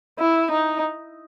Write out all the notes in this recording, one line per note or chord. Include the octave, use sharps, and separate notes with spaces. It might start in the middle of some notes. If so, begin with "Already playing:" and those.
E4
D#4